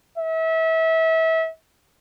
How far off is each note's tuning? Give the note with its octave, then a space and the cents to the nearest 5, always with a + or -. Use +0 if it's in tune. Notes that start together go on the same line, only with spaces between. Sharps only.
E5 -30